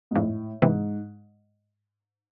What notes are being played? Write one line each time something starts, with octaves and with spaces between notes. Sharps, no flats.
G#2
F2 A2
G#2 C3 E3